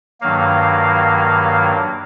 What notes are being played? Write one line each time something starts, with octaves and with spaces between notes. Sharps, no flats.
G2 D#3 F#3 A#3 F5